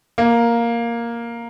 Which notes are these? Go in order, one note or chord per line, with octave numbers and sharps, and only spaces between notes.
A#3